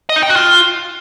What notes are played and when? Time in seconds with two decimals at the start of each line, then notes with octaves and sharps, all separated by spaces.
0.09 D#5
0.16 D#4
0.23 G5
0.29 F#4
0.36 F4